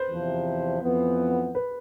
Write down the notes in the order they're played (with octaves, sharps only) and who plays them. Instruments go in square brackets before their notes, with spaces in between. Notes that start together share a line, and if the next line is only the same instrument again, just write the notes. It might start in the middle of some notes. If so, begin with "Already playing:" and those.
Already playing: [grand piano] B4 C5
[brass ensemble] E2 C3 F3
F2 E3 B3
[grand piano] B4